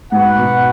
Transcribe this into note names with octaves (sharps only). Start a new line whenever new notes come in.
G#2 F#4 B4 F#5
B2